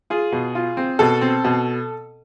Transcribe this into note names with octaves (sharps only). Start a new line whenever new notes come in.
F4 G#4
B2
F4
C4
B2 A4
C4
B2